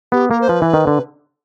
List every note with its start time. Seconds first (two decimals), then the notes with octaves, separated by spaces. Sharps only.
0.12 B3 G4
0.31 A#3 A#4
0.41 C5
0.49 F3 B4
0.62 E3
0.74 D#3
0.87 D3